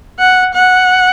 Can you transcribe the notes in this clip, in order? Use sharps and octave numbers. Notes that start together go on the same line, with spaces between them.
F#5
F#5